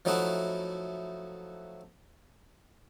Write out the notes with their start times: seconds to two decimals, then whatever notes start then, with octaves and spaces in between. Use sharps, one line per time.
0.05 F3 F#3 A3 D#4 E4 F#4